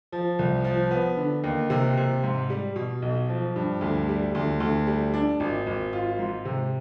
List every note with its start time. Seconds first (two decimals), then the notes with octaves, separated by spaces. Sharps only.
0.12 F3
0.39 C2
0.64 F3
0.91 B3
1.17 D3
1.44 D#2
1.70 C3
1.97 C3
2.23 G#2
2.50 G3
2.76 B2
3.02 B1
3.29 F3
3.56 G2
3.81 D2
4.09 G3
4.35 D2
4.60 D2
4.87 G3
5.14 D4
5.40 G#1
5.67 G#1
5.93 F4
6.19 G#2
6.45 C3